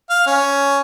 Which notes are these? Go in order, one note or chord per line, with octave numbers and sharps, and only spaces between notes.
F5
C#4